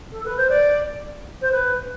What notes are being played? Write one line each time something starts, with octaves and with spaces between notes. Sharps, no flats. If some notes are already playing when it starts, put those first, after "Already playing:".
A4
B4
C5
D5
C5
B4